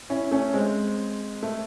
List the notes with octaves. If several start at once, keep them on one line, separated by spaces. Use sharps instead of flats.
C#4 E4
A3 C#4
G#3 C4
A3